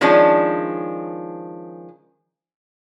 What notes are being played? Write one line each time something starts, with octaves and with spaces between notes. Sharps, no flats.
D#3 F3 G#3 C#4 D4